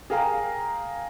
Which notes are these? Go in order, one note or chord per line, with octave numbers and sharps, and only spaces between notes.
G#4 A#4 F5 G5 A#5